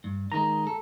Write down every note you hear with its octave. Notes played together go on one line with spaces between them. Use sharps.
G2
D#3 G#3 A#5
A4